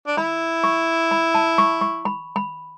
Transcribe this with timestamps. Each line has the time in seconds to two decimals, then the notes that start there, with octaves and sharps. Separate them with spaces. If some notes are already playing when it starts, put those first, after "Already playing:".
0.07 D4
0.17 E4 B5
0.64 C#6
1.11 B5
1.35 A5
1.58 C#6
1.81 C#6
2.05 B5
2.36 B5